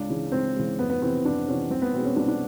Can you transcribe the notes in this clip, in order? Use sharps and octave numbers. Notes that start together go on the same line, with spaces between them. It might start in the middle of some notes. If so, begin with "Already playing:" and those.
Already playing: C#2 D4
C#3 E3 G#3
C#2 C4
C#3 E3 G#3
F2 B3
B3
C3 E3 C4
F2 D4
C3 E3 C#4
C2 C4
B3
B2 G#3 C4
C#4
C2 D4
D4